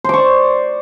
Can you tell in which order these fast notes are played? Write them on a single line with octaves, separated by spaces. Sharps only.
C5 D6 C#6 D5